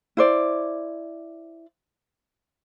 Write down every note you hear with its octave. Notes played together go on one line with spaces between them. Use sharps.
E4 C5 D5